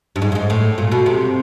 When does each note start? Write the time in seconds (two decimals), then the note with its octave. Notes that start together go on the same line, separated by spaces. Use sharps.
0.16 G2
0.22 G#2
0.32 G2
0.35 G#2
0.50 A2
0.78 A#2
0.92 B2
1.06 C3